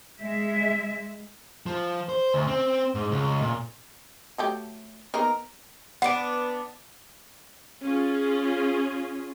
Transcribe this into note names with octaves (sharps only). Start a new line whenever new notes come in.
G#3 E5
F3
C5
D2
C4
G#2
C#2
A#2
F#3 A3 G4
A#3 B3 D#4 A#4
B3 D4 F#5 D7
C#4 F4 G#4